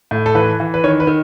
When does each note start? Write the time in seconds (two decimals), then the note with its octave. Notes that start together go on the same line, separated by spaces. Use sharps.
0.11 A2
0.26 A4
0.35 E3 B4
0.60 E3
0.74 B4
0.84 D#3 C#5
1.00 B4
1.07 D#3